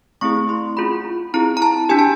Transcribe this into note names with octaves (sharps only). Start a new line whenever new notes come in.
A3 C4 E4 G#4 C#6
C6
C#4 F4 G#4 B5
C4 E4 G#4 A#5
A#5
A5
D4 G4 G#5
A5